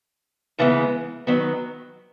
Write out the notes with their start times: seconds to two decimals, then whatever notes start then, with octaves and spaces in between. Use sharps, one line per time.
0.59 D#2 C#3 E3 G#3 B3
1.27 D#3 F#3 B3